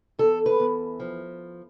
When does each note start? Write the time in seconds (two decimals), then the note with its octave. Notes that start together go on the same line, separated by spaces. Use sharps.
0.19 E2 A4
0.46 B4
0.60 E2
1.00 F3